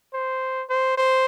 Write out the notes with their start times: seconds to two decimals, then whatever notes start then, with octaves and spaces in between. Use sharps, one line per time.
0.13 C5
0.69 C5
0.97 C5